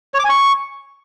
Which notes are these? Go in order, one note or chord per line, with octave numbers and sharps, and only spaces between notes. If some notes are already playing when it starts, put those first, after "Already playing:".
C#5
D6
G#5
C#6